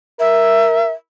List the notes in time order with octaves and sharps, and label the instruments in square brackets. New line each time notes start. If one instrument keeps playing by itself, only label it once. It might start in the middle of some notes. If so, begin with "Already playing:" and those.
[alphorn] A#4 [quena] E5